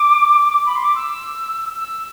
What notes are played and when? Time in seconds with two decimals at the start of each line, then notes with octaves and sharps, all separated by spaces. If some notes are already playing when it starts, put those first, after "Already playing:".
Already playing: D6
0.65 B5
0.75 C6
0.84 D6
0.95 E6
1.76 E6